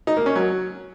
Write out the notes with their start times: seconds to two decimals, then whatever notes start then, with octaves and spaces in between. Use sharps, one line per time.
0.07 D#4
0.17 A#3
0.26 C#4
0.36 F#3